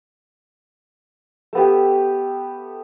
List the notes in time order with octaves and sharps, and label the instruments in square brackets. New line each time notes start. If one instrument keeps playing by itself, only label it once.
[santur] A3 B3 G4